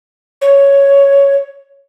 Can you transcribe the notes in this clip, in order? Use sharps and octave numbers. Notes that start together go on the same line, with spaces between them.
C#5